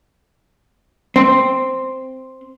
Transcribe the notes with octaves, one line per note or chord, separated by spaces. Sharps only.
C4